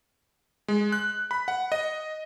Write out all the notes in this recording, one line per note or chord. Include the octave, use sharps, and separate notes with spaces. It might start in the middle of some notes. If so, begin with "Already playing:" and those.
G#3
F#6
B5
F#5
D#5